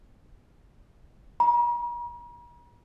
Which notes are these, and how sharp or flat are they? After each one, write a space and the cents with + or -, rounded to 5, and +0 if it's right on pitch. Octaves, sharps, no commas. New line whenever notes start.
A#5 +45